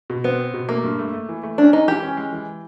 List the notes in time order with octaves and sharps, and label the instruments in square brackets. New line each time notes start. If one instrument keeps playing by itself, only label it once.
[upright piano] B2
[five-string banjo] B3 [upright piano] C4
[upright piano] C4
B2
[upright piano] A3 [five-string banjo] A#3
[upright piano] G2
A3
A3
E3
A3
[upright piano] C#4 [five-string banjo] D4
[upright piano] G#3 [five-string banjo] D#4
[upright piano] E3 [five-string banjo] G4
[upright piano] C#4
G#3
E3